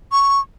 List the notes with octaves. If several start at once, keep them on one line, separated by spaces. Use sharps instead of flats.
C#6